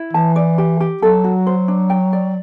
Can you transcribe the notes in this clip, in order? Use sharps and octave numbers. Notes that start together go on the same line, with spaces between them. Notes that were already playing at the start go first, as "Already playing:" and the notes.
Already playing: E4
E3 A5
D5
G4
G4
F#3 A4
F#4
C5
D4
G5
D5